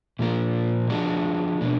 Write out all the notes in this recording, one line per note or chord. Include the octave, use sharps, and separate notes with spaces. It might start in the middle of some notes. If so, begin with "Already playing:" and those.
A#2 F3 A#3
F3 G#3 D4 F#4
B2 A#3 D4